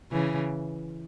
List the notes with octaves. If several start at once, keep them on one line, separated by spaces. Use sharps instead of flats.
C#3 E3